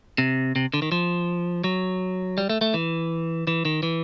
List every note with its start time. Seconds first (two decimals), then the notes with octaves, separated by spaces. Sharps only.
0.18 C3
0.56 C3
0.74 D3
0.82 D#3
0.92 F3
1.64 F#3
2.38 G3
2.50 A3
2.61 A3
2.74 E3
3.47 E3
3.65 D#3
3.83 E3